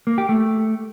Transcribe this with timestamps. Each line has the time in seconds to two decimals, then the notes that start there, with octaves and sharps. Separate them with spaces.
0.07 A#3
0.18 G4
0.29 A3